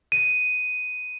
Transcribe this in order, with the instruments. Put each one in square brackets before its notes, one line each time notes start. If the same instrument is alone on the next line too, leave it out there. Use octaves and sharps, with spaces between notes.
[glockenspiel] D#7